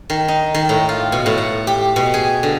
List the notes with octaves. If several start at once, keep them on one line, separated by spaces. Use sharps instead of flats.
D#3
D#4
D#3
A2
F4
B2
A2
F#5
G4
B2
G#4
D3